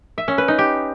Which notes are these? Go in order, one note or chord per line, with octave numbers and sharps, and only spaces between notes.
E5
C#4
B4
D#4
G4